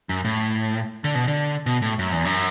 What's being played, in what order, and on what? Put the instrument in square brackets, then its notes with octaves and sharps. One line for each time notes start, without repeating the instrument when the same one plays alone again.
[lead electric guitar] F#2
A2
D3
B2
D3
B2
A2
F#2
E2
F#2